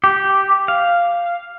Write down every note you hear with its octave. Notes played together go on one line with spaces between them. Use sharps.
G4
F5